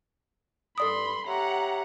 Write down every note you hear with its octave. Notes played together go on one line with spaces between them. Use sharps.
G2 A4 D5 B5 C6 D#6
G4 C#5 E5 F#5 A#5